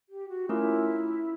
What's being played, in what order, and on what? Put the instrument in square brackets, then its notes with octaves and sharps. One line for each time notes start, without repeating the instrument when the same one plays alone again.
[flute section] G4
F#4
[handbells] A3 C#4 F4 A#4 [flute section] E4